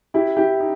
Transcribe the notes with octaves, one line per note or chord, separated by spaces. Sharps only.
E4 G4
E4 G4
D#4